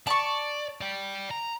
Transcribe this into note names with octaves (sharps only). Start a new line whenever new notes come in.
D5 A5 C#6
D5 G5
A#5